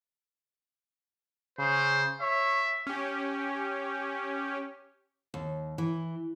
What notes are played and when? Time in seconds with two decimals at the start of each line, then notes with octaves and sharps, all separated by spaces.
1.59 C#3 C5
2.21 C#5 E5
2.87 C#4 G4
5.34 D#2
5.78 E3